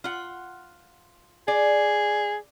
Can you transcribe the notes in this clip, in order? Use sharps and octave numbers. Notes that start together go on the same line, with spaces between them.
F4 F#5
G#4 D5